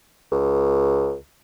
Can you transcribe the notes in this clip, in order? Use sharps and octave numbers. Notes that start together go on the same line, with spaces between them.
C#2